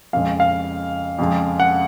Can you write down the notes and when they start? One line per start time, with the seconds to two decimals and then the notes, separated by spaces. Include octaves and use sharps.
0.13 F2 C#3 G#3 F5
0.40 F5
1.19 F2 C#3 F3 G#3
1.60 F#5